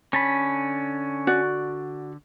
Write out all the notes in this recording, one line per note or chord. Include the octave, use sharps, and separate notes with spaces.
D3 C#4 A5 B5
F#4 D5